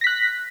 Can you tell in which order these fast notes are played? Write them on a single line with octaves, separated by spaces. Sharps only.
A#6 B6 F#6